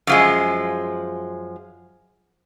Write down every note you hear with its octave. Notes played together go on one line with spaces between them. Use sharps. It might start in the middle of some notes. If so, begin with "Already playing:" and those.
F#2 F3 G#3